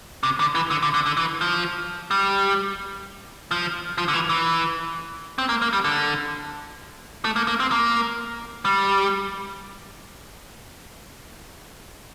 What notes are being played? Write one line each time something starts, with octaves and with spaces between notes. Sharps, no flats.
C3
D3
E3
D3
D3
D3
D3
E3
F3
G3
F3
F3
D3
E3
E3
C4
A#3
A#3
G3
D3
A3
A#3
A#3
C4
A#3
G3